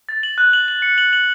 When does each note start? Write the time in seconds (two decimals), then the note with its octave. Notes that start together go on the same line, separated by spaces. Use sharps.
0.09 A6
0.23 F#7
0.38 F#6
0.53 F#7
0.68 F#7
0.82 C#7
0.98 F#7
1.13 F#7